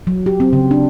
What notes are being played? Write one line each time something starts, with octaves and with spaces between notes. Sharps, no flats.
F#3
G4
C4
C#3
D4